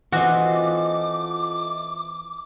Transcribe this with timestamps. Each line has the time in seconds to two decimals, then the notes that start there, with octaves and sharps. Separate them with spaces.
0.12 E3 A3 C4 F4 F#4 D#5 D6